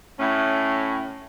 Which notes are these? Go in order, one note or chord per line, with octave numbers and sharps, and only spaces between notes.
A2 C#4